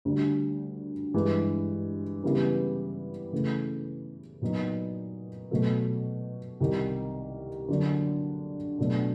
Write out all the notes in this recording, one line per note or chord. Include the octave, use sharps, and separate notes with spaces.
D2 D3 G3
G2 E3 G#3
C#3 E3 G3 B3 E4
C#3 E3 A3
A#2 F#3 B3 D#4
B2 F#3 A3
C2 C3 D#3
D3 F#3 A#3 D4
B2 F#3 A3 D4